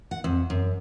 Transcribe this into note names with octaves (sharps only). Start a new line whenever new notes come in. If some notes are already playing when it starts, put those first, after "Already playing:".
F#5
F2
F#2